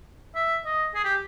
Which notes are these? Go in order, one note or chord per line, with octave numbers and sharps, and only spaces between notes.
E5
D#5
G#4
G4